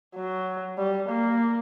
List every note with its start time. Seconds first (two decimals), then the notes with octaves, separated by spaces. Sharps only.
0.15 F#3
0.78 G3
1.09 A#3